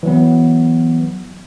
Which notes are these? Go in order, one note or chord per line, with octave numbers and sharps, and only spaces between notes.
E3 F#3 B3